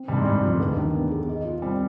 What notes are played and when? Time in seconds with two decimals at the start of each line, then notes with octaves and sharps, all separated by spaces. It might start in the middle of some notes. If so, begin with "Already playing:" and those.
Already playing: C4
0.08 G2 D#3 G3
0.17 G#2 G#3
0.25 G2 C3 G3
0.42 F2 F3 G3
0.53 D3
0.60 D#2 D#3 B4
0.77 D#2 D#3 D4
0.94 B3
1.11 G#4
1.29 D#5
1.45 F4
1.62 G3 C4